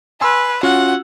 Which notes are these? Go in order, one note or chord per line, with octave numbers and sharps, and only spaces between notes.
B4 G#5 C6 E6
C#4 F4 F#4 F#5